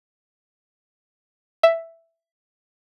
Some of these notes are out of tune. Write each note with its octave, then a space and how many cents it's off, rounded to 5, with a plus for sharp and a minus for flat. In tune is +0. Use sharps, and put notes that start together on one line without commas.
E5 +5